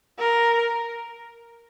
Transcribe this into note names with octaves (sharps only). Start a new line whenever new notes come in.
A#4